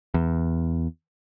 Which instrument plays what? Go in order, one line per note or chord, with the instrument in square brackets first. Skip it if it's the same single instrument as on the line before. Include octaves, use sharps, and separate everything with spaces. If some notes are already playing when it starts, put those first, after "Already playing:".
[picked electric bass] E2